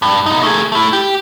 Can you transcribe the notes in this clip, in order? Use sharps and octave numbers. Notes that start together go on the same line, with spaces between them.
G2
C2 D#4
A3 G#4
A3 E4
G4